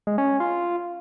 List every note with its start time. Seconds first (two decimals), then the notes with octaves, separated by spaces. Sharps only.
0.07 G#3
0.18 C#4
0.29 C#4
0.40 F4